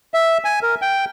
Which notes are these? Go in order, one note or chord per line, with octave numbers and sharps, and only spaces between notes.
E5
G#5
A#4
G5